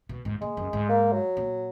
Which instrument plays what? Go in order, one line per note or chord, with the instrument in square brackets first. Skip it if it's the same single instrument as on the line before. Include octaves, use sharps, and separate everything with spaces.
[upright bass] B2
G#2
[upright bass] A#2 [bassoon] G#3
[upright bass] F#2
G#2
[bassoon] A#3
F#3
[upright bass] A#2